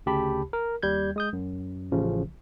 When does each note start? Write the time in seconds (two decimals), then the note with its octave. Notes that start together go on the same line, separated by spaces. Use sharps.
0.06 D2 C#3 G4 A5 B5
0.53 A#4
0.83 D#2 G3 G6 G#6
1.16 G#3 D#6 G6
1.33 F#2
1.92 A1 C#3 F3